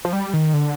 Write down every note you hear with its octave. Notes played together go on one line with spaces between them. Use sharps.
F3
G3
D#3
D3